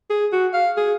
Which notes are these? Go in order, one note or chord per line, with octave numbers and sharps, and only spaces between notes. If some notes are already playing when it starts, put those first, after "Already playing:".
G#4
F#4
F5
G#4